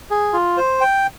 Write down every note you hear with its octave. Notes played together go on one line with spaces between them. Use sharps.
G#4
F4
C5
G5